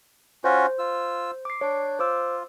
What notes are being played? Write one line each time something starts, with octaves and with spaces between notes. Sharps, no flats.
C#4 F4 F#4 C5
F4 E6
D6 C7
D4 C#5
F4 C5 D6 E6